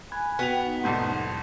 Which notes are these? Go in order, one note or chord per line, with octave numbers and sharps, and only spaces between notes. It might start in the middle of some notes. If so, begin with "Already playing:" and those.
G#5 B5 F#6 G#6
B3 F#4 G5 F7
D#4 F#5
C2 F2 A2 C6